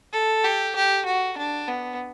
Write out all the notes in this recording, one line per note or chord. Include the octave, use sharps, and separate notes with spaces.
A4
G4
G4
F#4
D4
B3